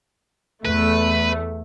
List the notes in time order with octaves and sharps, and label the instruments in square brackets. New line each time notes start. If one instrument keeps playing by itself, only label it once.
[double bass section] E2 [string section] A3 [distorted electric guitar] B4